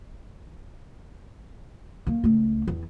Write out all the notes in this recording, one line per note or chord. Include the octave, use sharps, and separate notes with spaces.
D#3 A#3
C#2 A3
E2